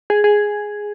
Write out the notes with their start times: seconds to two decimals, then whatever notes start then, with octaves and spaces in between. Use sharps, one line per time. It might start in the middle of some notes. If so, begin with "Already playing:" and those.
0.10 G#4
0.24 G#4